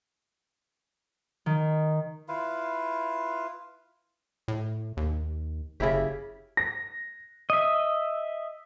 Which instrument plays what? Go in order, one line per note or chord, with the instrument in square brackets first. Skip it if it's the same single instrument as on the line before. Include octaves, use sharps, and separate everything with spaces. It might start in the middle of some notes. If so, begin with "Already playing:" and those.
[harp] D#3
[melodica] E4 F4 B4 F5
[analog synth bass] A2
D#2
[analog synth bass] F#1 [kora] C#3 E4 G4
[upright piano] A#6
[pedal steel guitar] D#5 E5